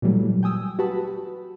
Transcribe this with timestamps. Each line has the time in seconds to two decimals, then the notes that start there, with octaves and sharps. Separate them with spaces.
0.02 A#2 E3 F#3 G3 A3
0.43 G5 G#5 D#6 E6
0.79 F#4 G4 B4 A5 B5